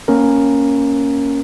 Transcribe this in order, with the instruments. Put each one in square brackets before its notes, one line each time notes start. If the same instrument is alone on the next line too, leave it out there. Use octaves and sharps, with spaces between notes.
[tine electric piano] A#3 C#4 A#4